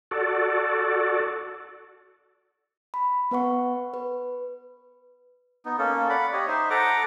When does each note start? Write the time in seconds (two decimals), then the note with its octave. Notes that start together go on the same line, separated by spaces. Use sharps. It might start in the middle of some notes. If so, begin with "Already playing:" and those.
0.11 F#4 A4 D5
2.94 B5
3.31 B3 B4 F#5 C#6
3.94 B4
5.65 B3 D#4
5.78 A#3 C#4 A4
6.10 D5 F#5 B5
6.33 G4 C#5 D#5
6.47 D#4 C5 E5
6.70 A4 F#5 A#5 D6